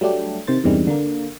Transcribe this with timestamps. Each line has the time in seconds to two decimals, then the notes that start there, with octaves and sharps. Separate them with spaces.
0.01 F#3 G3 A3 D4 G4
0.47 C3 D#3 C5 A6
0.64 E2 G2 C3 D#3 G3 G#3
0.87 D3 A#3